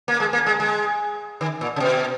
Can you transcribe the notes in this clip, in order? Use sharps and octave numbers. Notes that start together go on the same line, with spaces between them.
A#3
G#3
A#3
G#3
G#3
D#3
A#2
C#3
B2